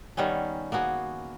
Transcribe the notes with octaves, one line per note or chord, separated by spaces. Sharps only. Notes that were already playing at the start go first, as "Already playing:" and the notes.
D#3 G3 B3 C#4
A#3 B3 F#4 G#4